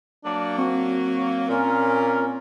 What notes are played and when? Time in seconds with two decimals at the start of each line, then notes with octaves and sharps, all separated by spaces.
0.25 F#3 A#3 D4
0.58 C4 F#4
1.49 A#2 C#4 F4 A#4